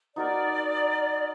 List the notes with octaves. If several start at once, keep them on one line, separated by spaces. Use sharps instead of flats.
D#4 F#4 A#4 D5